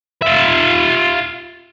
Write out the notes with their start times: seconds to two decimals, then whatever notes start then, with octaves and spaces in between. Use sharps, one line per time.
0.22 F4 E5